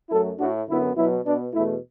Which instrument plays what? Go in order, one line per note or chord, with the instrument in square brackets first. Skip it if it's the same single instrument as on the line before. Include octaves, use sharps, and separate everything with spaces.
[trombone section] F#2 F#3 A3 E4 A4
A2 A3 D4 F#4
F#2 D3 B3 E4
B2 F#3 B3 E4
B2 B3 D4
E2 B2 A3 E4